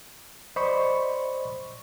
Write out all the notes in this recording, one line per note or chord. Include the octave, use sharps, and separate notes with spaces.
C5 D5 D#5 B5 C#6